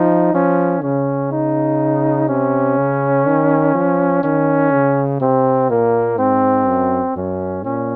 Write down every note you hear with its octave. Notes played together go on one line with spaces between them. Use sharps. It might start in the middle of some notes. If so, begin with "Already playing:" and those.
Already playing: F3 D#4
F3 C#4
C#3 C#4
D#4
C3 C#4
C#3
D#3
F3
D#3 C#4
C#3
C3 C4
A#2 A#3
G#2 C4
F#2
F#2 C#4
A#2 C#4